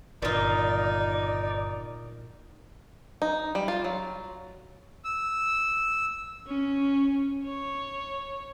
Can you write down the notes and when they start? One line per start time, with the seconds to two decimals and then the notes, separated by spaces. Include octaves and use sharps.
0.22 G1 A#2 D#3 D#4 F4 D5
3.22 D#4
3.55 G3
3.68 F4
3.84 F#3
5.05 E6
6.47 C#4
7.46 C#5